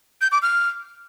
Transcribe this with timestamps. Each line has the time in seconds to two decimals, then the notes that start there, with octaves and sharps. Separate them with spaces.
0.21 G6
0.32 D6
0.42 F6